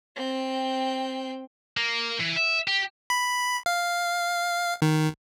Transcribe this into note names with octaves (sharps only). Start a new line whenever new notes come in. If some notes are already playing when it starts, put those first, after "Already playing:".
C4 G5
A#3
E3
E5
G4
B5
F5
D#3